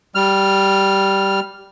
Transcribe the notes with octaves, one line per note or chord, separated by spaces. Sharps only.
G3 F6